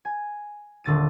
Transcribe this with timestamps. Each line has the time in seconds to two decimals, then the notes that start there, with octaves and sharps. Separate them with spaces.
0.05 G#5
0.84 D#1 D3 A6 D#7